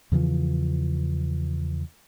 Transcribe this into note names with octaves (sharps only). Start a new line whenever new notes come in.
E2 C#3 E3 F3